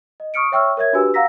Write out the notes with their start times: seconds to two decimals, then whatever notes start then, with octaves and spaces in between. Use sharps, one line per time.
0.20 D#5
0.34 C#6 D#6 F6 C#7 D7
0.52 C#5 E5 G5 C#6 E6 F6
0.77 A#4 C#5 E5 G#6
0.93 D4 F#4 G4 B4 G#5 E6
1.14 F5 F#5 A#5 E6 A#6 B6